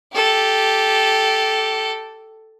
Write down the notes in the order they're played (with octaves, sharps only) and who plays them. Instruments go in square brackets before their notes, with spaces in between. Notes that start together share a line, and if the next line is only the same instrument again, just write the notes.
[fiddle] G4 A4